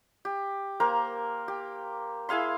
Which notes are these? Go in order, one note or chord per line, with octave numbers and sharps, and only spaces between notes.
G4
A#3 A#4 C5
G4
E4 G#4 F5 C6